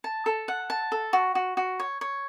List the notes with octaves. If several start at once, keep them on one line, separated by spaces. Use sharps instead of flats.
A5
A4
F#5
A5
A4
F#4
F#4
F#4
C#5
C#5